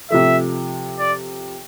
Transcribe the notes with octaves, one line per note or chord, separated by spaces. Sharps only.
C3 F3 A3 E5
D5